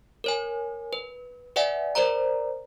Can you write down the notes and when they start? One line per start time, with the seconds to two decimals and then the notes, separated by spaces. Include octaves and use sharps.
0.24 A#4 C#5 G#5
0.93 B4
1.56 B4 D5 E5 F#5 G#5
1.95 A#4 C5 D5 A#5